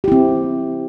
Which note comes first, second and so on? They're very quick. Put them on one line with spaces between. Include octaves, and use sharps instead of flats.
G4 E4 C4